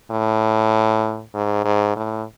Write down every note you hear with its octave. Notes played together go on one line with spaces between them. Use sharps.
A2
G#2
G#2
A2